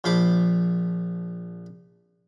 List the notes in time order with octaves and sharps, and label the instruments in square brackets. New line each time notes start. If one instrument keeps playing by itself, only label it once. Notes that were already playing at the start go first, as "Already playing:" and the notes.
[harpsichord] A#1 F3 C5 B5 D6